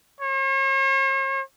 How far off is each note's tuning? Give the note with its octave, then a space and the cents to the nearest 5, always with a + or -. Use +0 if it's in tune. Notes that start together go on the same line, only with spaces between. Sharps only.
C#5 -45